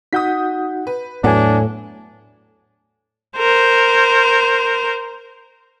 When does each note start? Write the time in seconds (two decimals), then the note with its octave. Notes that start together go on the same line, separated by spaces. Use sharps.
0.13 D#4 F#4 F#5 D#6 G6 B6
0.87 B4
1.24 E2 A2 F#3 B3 D4 G#5
3.37 A#4 C5